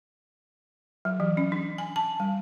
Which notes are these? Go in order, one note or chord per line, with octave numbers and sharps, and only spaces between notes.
F#3
E3
C#4
D4
G#5
A5
G3